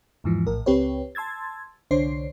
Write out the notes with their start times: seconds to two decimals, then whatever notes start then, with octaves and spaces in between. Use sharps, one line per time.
0.24 E2 G#2 E3 F3
0.47 A#1 A2 A#4
0.66 C#2 C4 G4 B4 C#5
1.15 A5 C6 E6 G#6 A6
1.91 C2 D3 D4 C5 C#5 C7